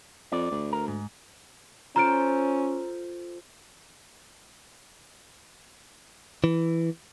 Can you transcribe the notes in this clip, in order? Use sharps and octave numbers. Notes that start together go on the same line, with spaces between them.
F2 D5
D2
A#4
G#2
C#4 F4 A4 C5 A#5 F6 D7
E3